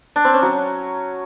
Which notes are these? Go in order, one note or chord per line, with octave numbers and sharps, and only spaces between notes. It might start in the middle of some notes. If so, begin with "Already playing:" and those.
D4
C4
C#4
F#3